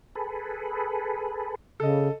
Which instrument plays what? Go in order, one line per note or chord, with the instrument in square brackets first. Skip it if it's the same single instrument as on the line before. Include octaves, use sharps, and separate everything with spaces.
[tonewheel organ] G#4 A4 B4
[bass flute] C#3 [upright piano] A4 D#5